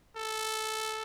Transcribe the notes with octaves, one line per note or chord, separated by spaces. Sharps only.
A4